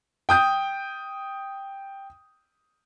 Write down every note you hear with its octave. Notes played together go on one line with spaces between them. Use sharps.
G5 D#6 G6